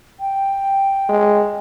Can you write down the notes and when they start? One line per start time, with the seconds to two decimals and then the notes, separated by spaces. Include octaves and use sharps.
0.20 G5
1.09 G#3